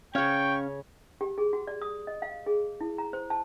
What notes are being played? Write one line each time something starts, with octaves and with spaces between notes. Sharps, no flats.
C#3 C#4 C#5 F5 G5 C#6
G4
G#4
F#4
D5
D#6
D#5
F5
G#4
E4
A#5
C5
A5